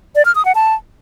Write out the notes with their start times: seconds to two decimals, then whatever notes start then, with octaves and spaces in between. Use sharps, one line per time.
0.15 D5
0.25 F6
0.35 D#6
0.45 F#5
0.55 A5